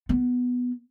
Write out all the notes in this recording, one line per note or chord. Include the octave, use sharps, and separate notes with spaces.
B3